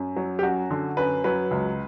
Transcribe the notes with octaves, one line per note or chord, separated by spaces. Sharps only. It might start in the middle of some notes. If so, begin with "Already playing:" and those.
Already playing: F#2
F#3
G4
F#2 F#4
D3
F#2 B4
F#3 B4
C#2